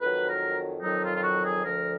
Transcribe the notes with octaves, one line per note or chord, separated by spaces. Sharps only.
F2 D#3 F#3 B4
A#4
F2 D#3 F#3 D#4
F4
F4
F#4
G#4
D2 D3 F3 A#4